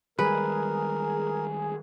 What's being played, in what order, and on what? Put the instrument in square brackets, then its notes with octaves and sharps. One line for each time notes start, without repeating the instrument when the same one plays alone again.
[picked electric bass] D#3 G3 G#3 [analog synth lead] G#4 [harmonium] A#4 [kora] B4